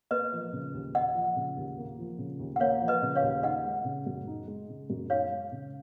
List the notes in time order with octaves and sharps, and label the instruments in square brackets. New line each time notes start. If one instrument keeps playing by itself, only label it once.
[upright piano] A#3 [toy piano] B4 D#5
[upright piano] F3
C#3
D#2
[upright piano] A#3 [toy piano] D#5 F#5
[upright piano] F3
C#3
D#2
A#3
F3
C#3
D#2
[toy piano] F#5
[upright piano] A#3 [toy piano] C#5 F5
[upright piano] F3
[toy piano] B4 D#5
[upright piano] C#3
[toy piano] C#5 F5
[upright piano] D#2
[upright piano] D#4 [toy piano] D#5 F#5
[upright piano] G#3
C#3
F#2
D#4
G#3
C#3
F#2
[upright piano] D#4 [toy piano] C#5 F5
[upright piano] G#3
C#3